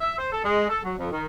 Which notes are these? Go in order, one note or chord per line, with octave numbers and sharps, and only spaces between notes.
E5
C5
A4
G#3
A4
F#3
F2
D#3